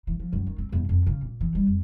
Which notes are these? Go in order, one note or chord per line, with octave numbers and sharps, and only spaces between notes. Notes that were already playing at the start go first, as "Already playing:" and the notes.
E3
F3
F#2
D#3
C4
E2
F2
C#3
A#2
E3
G3
F2